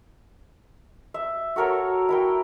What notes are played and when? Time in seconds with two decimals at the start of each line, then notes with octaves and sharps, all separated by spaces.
1.14 E5
1.56 F#4 A4 A#4 C#5
2.09 E4 A#4 G5